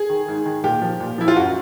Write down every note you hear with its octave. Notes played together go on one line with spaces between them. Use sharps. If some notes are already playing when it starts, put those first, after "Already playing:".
Already playing: G#4
D#3
G#2
D#3
A#2 G4
F3
A#2
F3 E4
F4
F#2 F#4